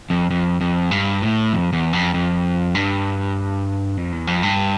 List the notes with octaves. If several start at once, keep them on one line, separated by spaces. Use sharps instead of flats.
F2
F2
F2
G2
A2
F2
E2
F2
F2
G2
F2
E2
F2
G2